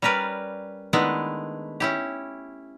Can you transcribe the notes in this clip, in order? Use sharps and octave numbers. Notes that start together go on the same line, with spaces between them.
G3 C#4 A#4 B4 D5
D#3 G#3 A3 B3 D4 E4
C#4 E4 G4